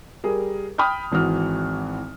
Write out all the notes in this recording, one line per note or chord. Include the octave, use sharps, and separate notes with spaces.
G3 G#4 A#4
G5 B5 D#6 F6 G6
G#1 E3 F#4 F6